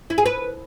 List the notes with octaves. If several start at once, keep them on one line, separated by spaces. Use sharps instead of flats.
E4
G#4
B4